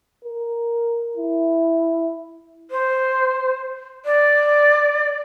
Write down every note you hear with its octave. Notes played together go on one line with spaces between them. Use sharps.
A#4
E4
C5
D5